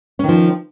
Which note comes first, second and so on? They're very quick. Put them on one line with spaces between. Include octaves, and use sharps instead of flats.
C#4 D#3 F3